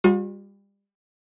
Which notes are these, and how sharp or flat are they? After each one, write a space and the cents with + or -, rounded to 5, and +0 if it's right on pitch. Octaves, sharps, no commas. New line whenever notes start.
G3 +30 F#4 -45 F5 +45